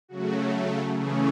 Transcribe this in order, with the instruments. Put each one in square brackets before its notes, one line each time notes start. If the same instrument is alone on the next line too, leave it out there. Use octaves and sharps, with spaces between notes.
[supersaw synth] C#3 F#3 A3 F#4
C#3 E3 A3 C#4 G#4